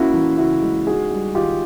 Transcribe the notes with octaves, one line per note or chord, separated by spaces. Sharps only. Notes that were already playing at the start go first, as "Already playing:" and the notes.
Already playing: A#3 C#4 E4 F#4
E3
C#3 E4 F#4
G#3
D#4 F#4 G#4
G3
D#3 F4 G4